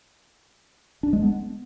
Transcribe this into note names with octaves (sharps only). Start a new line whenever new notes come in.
D4
G#3
B3